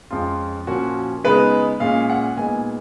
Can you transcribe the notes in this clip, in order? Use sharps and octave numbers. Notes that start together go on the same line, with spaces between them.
F2 F3 G#3 C#4 F4
A#2 F3 A#3 C#4 F#4
C#3 G#3 B3 D#4 B4
A#2 G#3 C#4 F5
F#5
A#2 G#3 B3 D#4 G#5